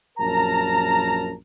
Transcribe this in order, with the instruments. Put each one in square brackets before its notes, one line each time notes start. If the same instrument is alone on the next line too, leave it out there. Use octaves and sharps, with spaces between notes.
[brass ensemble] A#1 F#2 A#4 A5 A#5